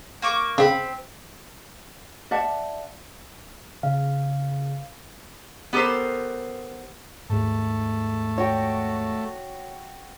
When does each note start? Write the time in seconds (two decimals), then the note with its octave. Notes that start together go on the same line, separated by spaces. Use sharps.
0.22 A#3 C#6 D6
0.58 C#3 C4 B5
2.31 D5 E5 F#5 A5
3.83 C#3 F5
5.73 B3 G4 A4 A#4 C5
7.30 D#2 G#2 A3
8.38 F#4 C#5 G5